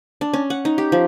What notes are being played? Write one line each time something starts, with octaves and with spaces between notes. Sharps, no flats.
D4
C#4
F#5
D#4
G4
F3